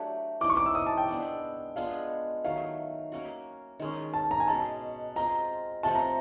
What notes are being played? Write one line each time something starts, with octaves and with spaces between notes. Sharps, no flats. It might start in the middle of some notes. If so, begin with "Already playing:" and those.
Already playing: F#3 A3 D4 G4
E3 G3 C4 D#4 D6
C#6
D6
E6
D#6
A5
G5
G#3 B3 D4
G#3 B3 D4 F4 F5
D#3 F#3 A3 F5
A#3 C#4 F#4
D#3 G#3 C#4
A5
A#5
G#5
B2 G#3 C#4 A5
G#3 C4 F4 A#5
C3 F3 A3 C4 A5
A#5